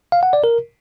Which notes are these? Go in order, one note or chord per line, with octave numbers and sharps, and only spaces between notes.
F5
F#5
D5
A#4